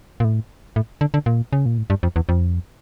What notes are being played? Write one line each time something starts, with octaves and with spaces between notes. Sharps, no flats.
A#2
A2
A2
D3
D3
A#2
C#3
A#2
A2
G2
F2
E2
F2